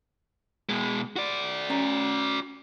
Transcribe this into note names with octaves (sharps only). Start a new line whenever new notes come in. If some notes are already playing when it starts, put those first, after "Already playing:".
B2 G#3
F#4 D5
C#4 G#5 A#5